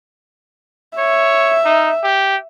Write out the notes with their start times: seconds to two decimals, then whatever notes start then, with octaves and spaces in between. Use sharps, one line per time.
0.98 C#5 E5
1.65 D#4
2.04 G4